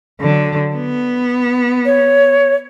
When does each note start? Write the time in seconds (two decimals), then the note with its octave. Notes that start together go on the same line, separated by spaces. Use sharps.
0.21 D3 F#3
0.76 B3
1.86 C#5